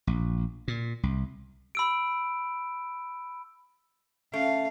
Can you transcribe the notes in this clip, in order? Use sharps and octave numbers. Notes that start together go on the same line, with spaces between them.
A#1
A#2
C2
B5 E6 D7
A3 C#4 F5